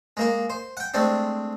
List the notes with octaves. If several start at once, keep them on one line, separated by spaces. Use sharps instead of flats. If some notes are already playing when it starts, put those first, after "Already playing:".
G#3 A#3 A#4
C5
F#5 G5
G#3 A3 C4 D4